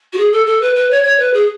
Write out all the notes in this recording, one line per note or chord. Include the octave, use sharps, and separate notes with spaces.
F#4
G#4
A4
A4
B4
B4
C#5
C#5
B4
G#4